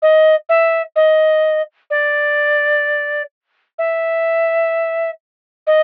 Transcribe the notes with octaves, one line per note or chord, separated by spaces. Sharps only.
D#5
E5
D#5
D5
E5
D#5